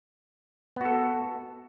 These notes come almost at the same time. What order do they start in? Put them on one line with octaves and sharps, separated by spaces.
B3 F#4 A4